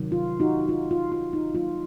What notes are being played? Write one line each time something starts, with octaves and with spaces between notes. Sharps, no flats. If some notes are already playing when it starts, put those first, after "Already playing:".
Already playing: C3 D#3 F#3
F4
D#4 F#4
F4
F4
F4
D#4
D#3 F#3 A#3 F4